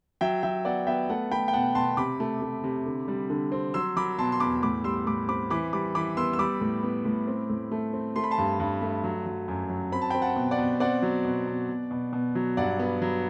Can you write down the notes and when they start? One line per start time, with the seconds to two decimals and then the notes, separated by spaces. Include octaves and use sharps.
0.21 F#3 E5 G5
0.43 F#3 E5 G5
0.65 B3 D5 F#5
0.87 B3 E5 G5
1.09 A3 F#5 A5
1.31 A3 G5 B5
1.48 G5
1.53 B2 F#5 A5
1.75 B2 A5 C6
1.97 C3 B5 D6
2.20 A3
2.42 A3
2.64 C3
2.86 D3
3.08 G3
3.30 D3
3.52 C4
3.74 F#3 C6 E6
3.96 F#3 B5 D6
4.18 B2 A5 C6
4.32 C6
4.40 E2 B5 D6
4.62 A2 B5 D6
4.84 G3 C6 E6
5.06 A2 B5 D6
5.28 C4 B5 D6
5.50 E3 B5 D6
5.73 G3 B5 D6
5.95 E3 B5 D6
6.17 B3 C6 E6
6.33 E6
6.39 G3 B5 D6
6.61 A2
6.83 B3
7.05 A2
7.27 C4
7.50 A2
7.71 A3
7.93 C4
8.16 A3 C6
8.24 B5
8.31 A5 C6
8.38 G2
8.60 G2
8.82 A3
9.04 F#3
9.26 F#3
9.48 F#2
9.70 F#3
9.92 C4 B5
10.02 A5
10.10 C4 G5 B5
10.22 F#5 A5
10.36 B2
10.51 D5 F#5
10.58 B2
10.80 C4 D5 F#5
11.02 F#3
11.25 B2
11.47 B2
11.69 B2
11.91 B2
12.13 B2
12.35 F#3
12.57 G2 D5 F#5
12.79 B3
13.02 F#3